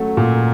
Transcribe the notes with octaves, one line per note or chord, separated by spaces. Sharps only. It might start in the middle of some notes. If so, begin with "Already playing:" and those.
Already playing: F#3 A3 C#4 A4
A#2